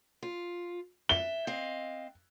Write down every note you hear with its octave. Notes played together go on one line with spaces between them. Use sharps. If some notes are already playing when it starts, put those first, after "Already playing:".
F4
E5 G7
C4 D#5 F5